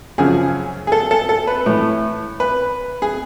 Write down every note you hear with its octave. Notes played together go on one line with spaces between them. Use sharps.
F#2 C#3 F3 G#4
G#4
A4
A4
A4
B4
A2 E3
B4
G#4